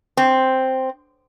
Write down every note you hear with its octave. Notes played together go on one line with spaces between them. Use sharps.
C4